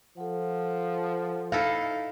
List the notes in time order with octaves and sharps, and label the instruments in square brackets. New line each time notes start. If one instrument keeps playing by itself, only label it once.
[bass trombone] F3 [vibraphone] A4 F#5
[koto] D#4 E4 A4 [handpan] F5